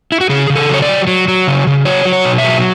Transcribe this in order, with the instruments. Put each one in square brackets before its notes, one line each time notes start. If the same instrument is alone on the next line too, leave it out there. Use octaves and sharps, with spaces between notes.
[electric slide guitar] E4
F#4
C#3 G#4
C#3
A4
F#3 C#5
D5
F#3
F#3
F#3
C#3
C#3
F#3 C#5
F#3
C#5
B2
E5
F#3